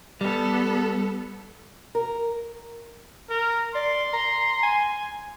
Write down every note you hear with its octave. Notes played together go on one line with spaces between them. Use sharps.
G3 B3 A4
A#4
A#4
D5 C6
A#5
G#5